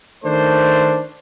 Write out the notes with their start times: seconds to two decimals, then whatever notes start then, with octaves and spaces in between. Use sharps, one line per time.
0.24 D#3 A3 D4 C5